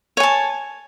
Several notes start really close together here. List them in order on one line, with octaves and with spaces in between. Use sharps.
C#5 G#5 A5